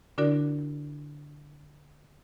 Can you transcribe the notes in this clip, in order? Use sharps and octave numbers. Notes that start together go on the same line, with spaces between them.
D3 D4 E4 F#4 A#4 D5